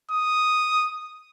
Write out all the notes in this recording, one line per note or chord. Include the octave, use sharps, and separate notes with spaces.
D#6